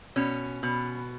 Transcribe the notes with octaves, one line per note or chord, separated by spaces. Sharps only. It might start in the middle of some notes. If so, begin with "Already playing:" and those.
B2 C#4
B2